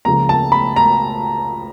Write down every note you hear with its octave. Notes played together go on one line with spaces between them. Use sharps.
C#2 C#3 F3 A#3 A#5
A5
B5
A#5